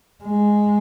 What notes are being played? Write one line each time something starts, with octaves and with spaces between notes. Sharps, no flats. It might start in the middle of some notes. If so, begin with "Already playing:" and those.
G#3